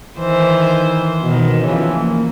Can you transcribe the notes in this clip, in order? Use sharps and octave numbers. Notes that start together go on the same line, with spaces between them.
D#3 E3 C5
B2 D#3
C#3 E3 F3
A#3